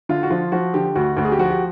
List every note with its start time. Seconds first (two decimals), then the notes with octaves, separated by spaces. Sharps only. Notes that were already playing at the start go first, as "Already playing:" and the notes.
0.09 D3 F4
0.23 F#4
0.30 F3 F4
0.52 F3 F#4
0.74 D3 G4
0.95 D2 F#4
1.17 D2 F#4
1.25 G#4
1.32 G4
1.39 F3 F#4
1.50 G4